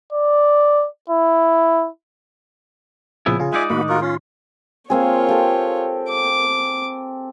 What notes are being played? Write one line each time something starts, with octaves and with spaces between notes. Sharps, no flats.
D5
E4
A#1 C#3 F3 B3 E4 G#4
C#3 F4 G#4
G#3 D#4 D5 E5 G#5
A2 D#3 A#3 F#4 B5
F4 F#4 A#4
C#4 F4
A#3 C4 F4 G#4 C#5
G4 A4
D6